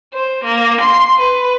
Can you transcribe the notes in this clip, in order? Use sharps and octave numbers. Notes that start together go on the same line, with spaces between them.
C5
A#3
C6
B4